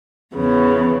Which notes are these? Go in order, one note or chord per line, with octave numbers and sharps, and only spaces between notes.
E2 C#3 B3